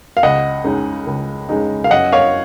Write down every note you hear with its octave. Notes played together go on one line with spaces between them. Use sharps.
F5
C#2 D#5 F#5
C#3 G#3 D#4
C#2
C#3 G#3 D#4
F5
F#2 D#5 F#5
C#5 F5